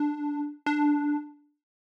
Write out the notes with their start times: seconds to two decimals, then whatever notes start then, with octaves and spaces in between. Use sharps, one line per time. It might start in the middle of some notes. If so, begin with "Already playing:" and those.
Already playing: D4
0.66 D4